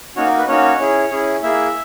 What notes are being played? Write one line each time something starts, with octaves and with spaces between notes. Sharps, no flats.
A#3 C#4 D#4 F#4 C#5
A#4
B4
A#3 C#4 D#4 F#4 C#5
C#4 E4 G#4
C#4 E4 G#4
A#3 E4 G#4 E5